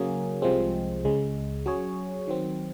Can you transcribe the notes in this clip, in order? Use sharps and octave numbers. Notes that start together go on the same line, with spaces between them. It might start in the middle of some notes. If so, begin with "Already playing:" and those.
Already playing: C#3 F#3 A#3 C#4 G#4
C2 C3 F3 G#3 C4
C#2 C#3 G#3
F#3 C#4 G#4 C#5
D#3 F#3 C4